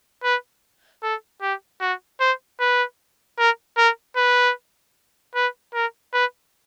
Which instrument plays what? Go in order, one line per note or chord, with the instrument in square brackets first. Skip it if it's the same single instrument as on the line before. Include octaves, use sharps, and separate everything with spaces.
[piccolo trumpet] B4
A4
G4
F#4
C5
B4
A#4
A#4
B4
B4
A#4
B4